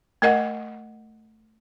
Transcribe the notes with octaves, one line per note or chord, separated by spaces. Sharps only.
A3 A#4 D#5 F#5